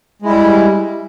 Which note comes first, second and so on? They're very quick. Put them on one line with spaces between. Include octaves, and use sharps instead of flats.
G#3 E4 G3